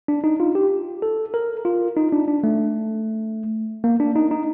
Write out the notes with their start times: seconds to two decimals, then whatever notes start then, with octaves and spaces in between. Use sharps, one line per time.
0.08 D4
0.24 D#4
0.40 F4
0.55 G4
1.02 A4
1.34 A#4
1.65 F4
1.97 D#4
2.12 D4
2.28 D4
2.44 A3
3.84 A#3
4.00 D4
4.16 D#4
4.31 D#4